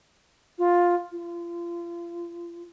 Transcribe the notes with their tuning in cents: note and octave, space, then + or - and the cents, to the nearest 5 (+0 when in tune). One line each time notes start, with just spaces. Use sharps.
F4 +10
F4 -30